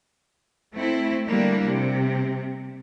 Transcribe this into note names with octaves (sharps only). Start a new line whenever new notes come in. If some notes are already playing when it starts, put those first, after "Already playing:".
A3 C4 E4
D3 G3 A#3 D4 E4
C3